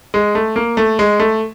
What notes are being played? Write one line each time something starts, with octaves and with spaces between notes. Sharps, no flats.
G#3
A3
A#3
A3
G#3
A3